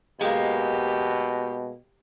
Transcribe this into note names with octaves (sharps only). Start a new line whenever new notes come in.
B2 G#3 A#3 G4